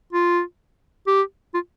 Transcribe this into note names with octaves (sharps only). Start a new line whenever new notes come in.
F4
G4
F4